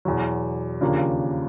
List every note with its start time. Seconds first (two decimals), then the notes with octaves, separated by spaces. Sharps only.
0.05 E2 B2 F#3
0.81 D#2 C#3 F3 A#3 D4